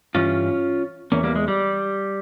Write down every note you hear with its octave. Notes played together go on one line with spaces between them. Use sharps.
G2 E3 C#4 F4
E2 E3 A#3 C#4
G3 A#3
G#3
G3